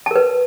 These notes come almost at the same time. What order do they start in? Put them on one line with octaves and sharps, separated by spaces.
A5 A#4 B4